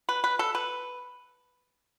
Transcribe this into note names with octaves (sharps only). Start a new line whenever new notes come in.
B4
B4
A4
B4